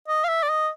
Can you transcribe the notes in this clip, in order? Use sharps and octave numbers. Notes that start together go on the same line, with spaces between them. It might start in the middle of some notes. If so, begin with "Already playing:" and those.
D#5
F5
E5
D5
D#5